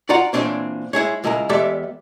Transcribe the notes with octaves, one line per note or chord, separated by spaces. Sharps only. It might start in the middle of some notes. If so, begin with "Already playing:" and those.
F4 F#4 D5 F#5 A#5
A#2 E3 G3 C4 D4 C#5
G#3 E4 G#4 C#5
C#2 G#3 E4 A#4 A#5
E2 G#3 G4 A4 D5 E5